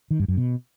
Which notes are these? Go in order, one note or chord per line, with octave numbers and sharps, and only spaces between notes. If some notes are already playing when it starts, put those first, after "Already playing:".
D#3
G2
F#2
B2